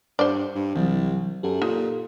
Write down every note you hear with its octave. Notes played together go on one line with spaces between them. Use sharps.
G2 C5 D5
G2
C2 E3 F#3
F#2 G4 A4
A#2 D#4